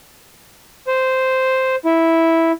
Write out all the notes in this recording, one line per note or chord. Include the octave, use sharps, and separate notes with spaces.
C5
E4